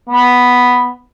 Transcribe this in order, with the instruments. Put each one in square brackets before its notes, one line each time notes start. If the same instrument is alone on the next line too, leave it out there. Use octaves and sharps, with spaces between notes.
[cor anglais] B3